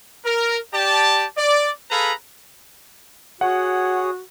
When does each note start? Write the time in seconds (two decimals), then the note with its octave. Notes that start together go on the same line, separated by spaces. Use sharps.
0.25 A#4
0.73 G4 D5 A5
1.36 D5
1.90 G#4 A4 B4 F5 A#5 B5
3.41 F#4 G#4 C#5 F#5 D#6